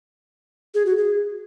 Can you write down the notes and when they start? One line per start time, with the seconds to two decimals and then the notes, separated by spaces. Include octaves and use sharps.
0.74 G#4
0.86 F#4
0.97 G#4